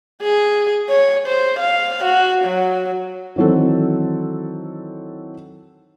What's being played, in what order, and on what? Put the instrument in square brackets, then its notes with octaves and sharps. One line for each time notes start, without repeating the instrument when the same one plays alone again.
[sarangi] G#4
C#5
C5
F5
F#4
F#3
[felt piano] D#3 E3 F#3 C4 A4